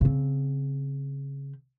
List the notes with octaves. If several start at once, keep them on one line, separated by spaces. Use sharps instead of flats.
C#3 C4